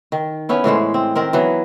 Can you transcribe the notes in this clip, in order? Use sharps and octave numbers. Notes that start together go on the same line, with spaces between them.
D#3
B3 C#4 E4
A2 E3 G#3 C5
C4
D#3 C4 A#4
E3 F#3 B3